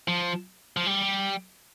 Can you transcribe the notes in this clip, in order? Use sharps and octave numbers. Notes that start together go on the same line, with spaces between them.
F3
F3
G3